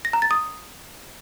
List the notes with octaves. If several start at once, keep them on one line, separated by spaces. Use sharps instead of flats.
A#6
A#5
A6
D#6